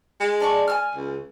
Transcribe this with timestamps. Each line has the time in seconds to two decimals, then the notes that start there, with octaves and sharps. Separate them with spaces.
0.20 G#3
0.40 D4 D5 C#6
0.68 G#5 A5 F6
0.94 C#2